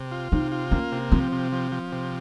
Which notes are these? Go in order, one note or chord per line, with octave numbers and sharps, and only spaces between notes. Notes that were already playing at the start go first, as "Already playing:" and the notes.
Already playing: C3
F4
C3 D#4
F4
A#3 C#4
C3
F3 C4
C3
F3
F3
C3